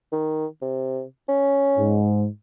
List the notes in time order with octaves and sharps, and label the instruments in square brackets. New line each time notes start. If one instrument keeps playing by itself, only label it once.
[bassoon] D#3
C3
C#4
[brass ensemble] G#2